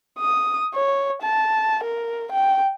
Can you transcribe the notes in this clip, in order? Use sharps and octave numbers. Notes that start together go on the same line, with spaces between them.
D#6
C#5
A5
A#4
G5